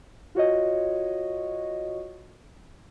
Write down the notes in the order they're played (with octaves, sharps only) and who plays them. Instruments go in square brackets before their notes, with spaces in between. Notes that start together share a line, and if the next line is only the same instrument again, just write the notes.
[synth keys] F4 F#4 C#5 D#5